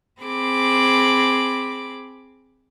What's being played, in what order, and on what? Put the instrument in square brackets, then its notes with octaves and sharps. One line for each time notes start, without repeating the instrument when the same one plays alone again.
[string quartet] C4 G#4 B5 D6